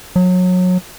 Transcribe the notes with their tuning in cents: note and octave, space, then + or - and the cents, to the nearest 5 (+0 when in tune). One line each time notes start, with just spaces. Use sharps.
F#3 -25